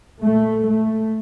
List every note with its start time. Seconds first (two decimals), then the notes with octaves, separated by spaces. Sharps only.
0.23 A#2 A3
0.67 A3